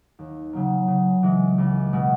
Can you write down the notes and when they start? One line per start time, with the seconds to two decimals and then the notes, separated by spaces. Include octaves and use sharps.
0.19 D#2
0.53 C#3 F#3 A#3
0.88 C#3
1.23 E3 G#3
1.58 C#2
1.93 B2 G#3